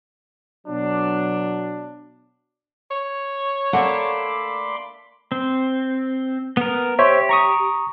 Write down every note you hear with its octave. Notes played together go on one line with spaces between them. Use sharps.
B2 F#3 D4
C#5
A3 A#3 D4 F#5 B5 C6 D6
C4
B3 A#4
G4 C5 C#5 E5
A#5 C#6 D#6